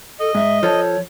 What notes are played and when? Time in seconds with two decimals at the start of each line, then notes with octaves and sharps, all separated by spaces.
0.20 A4 D#5
0.35 G#2 E5
0.63 F3 A4 C#5